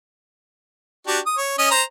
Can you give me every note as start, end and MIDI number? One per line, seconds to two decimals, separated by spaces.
1.07 1.19 62
1.07 1.19 66
1.07 1.19 67
1.26 1.36 87
1.38 1.54 73
1.58 1.70 61
1.58 1.70 75
1.71 1.83 72
1.71 1.83 82